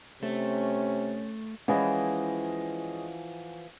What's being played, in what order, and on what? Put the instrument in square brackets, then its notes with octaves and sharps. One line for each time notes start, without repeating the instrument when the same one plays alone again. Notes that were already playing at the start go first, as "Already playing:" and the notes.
[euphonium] C3 [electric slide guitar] A3 [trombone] C#4
[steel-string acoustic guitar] E3 F3 [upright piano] G#3 C#4 D#5 [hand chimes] F#5 G#5